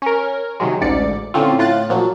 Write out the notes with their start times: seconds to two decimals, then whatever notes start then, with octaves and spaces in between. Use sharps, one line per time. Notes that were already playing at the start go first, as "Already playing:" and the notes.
0.02 C#4 A#4
0.60 C3 D#3 F#3 G#3
0.81 A1 D2 G#2 D5 C#7
1.34 A2 D3 C4 C#4 F4
1.59 A2 F4 F#6 A6
1.89 A#2 F3 F#3